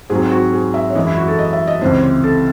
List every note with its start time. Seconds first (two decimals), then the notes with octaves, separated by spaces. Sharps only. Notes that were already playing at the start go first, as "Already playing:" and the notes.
0.10 G#2 F#3 C4 G#4
0.31 F#4
0.53 G#4
0.74 E5
0.90 C#5
0.95 F#2 E3 G#3 D#5
1.07 E4
1.17 F#4
1.28 A4
1.39 D#5
1.53 E5
1.67 D#5
1.81 C#2 C3 E3 C5
2.03 C5
2.24 A4